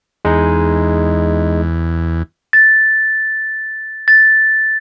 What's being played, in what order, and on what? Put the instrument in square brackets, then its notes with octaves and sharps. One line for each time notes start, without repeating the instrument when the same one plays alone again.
[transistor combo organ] E2 [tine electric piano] G#3 D#4
[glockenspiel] A6
A6